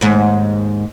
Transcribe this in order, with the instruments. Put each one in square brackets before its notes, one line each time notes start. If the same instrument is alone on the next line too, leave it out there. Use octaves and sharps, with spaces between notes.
[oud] D#2 G#2